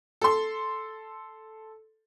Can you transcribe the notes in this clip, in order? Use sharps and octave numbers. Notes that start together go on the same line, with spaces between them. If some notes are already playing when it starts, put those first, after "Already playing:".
A4 C6